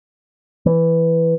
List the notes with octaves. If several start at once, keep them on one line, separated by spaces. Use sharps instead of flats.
E3